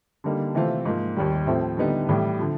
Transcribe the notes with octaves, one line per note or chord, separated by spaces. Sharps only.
D3 G3 A#3 D#4
C3 E3 A3 C4 F4
G#2 F3 A#3
D#2 D#3 G3
A2 F3 A3 C4
D3 G3 B3 D#4
A2 E3 G3
D3 F3